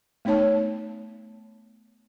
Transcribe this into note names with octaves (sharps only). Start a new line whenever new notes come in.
A3 B3 D#4 C#5 A5